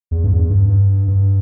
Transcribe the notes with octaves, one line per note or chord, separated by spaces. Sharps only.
E2
G2
E2
G2
G2
G2